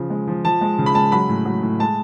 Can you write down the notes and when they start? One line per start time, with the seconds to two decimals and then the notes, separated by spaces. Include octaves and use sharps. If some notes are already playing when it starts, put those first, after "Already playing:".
Already playing: C#3 F3
0.10 G#3
0.28 F3
0.44 F3 A5
0.61 G#3
0.79 C#3
0.86 B5
0.95 G#3 A5
1.12 F#3 B5
1.29 A2
1.45 F#3
1.62 A2
1.79 G#3 A5